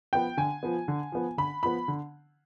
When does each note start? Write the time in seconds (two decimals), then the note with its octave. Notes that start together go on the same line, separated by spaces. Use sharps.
0.13 F3 B3 G5
0.37 D3 G#5
0.63 F3 B3
0.88 D3
1.12 F3 B3
1.38 D3 B5
1.63 F3 B3 B5
1.88 D3